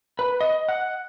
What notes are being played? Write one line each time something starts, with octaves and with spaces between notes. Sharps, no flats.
B4
D#5
F#5